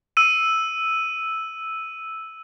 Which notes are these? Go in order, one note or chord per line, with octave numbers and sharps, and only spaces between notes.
E6 D#7